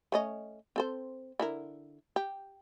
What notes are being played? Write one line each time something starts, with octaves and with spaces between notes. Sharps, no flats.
A3 C#4 D#5
C4 A4 C5
D3 E4 A#4
G4